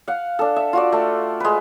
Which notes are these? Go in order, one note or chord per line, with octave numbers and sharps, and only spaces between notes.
F5 F#5
D4 A4
E5
F4 F#4 D5
A3
G#3 B4